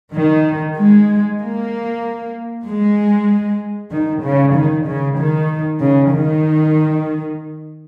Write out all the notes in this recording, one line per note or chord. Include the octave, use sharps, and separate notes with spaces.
D#3
G#3
A#3
G#3
D#3
C#3
D#3
C#3
D#3
C#3
D#3